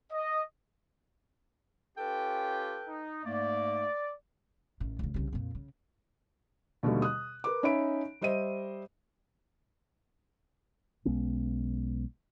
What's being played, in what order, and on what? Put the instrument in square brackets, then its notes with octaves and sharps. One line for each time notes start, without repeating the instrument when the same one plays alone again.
[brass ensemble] D#5
[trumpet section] C#4 F4 G4 [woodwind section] A4 B4 G5
[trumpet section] D#4
[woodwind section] G#2 A3 A#3 [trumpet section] D5
[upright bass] A1 D#3
C#2 C#3
C2 C#3
F2 A#2
C#3
[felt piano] D#2 B2 D3 G3 A3
D#6 F#6
A#4 B4 D6
C#4 D#4 C#5 E5 B5 D7
G3 C5 D#5 E5 D#7
[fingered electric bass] B1 G#3 B3 C#4